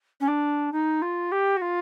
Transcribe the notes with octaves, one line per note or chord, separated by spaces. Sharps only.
C#4
D4
D#4
F4
G4
F#4
F4